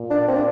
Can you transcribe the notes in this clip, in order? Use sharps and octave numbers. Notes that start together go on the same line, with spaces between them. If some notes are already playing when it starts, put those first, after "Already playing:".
Already playing: A#2
D4
C4
D4